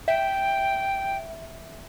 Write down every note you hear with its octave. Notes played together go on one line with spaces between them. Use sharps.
E5 G5